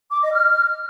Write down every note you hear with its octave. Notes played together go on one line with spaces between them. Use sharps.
D6
D#5
F6